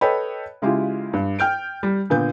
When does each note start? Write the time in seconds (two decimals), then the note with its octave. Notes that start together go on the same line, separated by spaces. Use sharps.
0.01 A4 B4 C#5 D#5 G5 B5
0.62 C#3 G#3 E4 F4 G4
1.13 G2
1.39 G5 F6 G6 D7
1.83 G3
2.10 A#2 D3 B3 G6